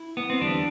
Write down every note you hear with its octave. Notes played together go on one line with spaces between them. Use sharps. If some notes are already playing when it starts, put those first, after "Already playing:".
Already playing: E4
B3
C4
E2 D3 G3 D4